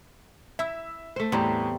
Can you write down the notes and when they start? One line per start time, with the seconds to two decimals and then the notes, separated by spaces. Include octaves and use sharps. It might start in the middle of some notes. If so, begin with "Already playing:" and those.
0.59 E4 E5 E6
1.16 A3 C5
1.32 E2 A2 G3 C4 G5 A#5